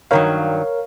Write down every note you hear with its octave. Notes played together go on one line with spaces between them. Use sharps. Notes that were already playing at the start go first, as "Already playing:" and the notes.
G2 D#3 F#3 A#4 C#5 F5